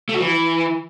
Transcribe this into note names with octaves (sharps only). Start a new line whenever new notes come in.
A3
F#4
E3